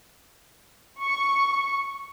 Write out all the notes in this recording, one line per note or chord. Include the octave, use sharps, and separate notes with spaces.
C#6